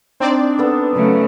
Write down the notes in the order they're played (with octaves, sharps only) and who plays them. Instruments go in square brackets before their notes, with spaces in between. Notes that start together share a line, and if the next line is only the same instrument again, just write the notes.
[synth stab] C4 D5 [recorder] D4 [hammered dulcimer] D#4
[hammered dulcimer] B3 A4 A5
[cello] C#3 A3 [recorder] F#3